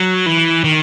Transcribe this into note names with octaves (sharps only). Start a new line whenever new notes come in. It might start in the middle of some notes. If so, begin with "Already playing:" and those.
Already playing: F#3
E3
D#3